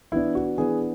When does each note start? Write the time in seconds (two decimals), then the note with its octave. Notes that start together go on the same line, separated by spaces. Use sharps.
0.12 E3 B3 D4 E4
0.35 F#4
0.58 E3 B3 D4 G#4